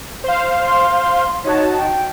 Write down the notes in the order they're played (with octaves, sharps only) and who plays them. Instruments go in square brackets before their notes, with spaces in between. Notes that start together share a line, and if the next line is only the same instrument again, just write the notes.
[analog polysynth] C5 F5
[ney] C6
[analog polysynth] D#4 F#4 A5 [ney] C#5
[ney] G5